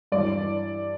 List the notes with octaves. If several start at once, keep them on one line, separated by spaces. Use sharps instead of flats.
G2 E3 D5